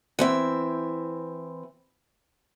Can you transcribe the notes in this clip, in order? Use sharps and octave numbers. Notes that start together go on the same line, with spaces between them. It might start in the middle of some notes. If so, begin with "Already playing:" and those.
E3 C4 E5